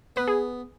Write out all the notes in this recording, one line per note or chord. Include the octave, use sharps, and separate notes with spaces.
B3 B4
G#4